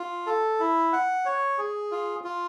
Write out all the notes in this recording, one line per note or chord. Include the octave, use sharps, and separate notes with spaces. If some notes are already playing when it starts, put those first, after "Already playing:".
Already playing: F4
A4
E4
F#5
C#5
G#4
F4
F4